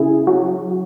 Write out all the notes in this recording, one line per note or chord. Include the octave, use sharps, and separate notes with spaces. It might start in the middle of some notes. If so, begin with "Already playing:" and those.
Already playing: C#3 E4 G#4
F#3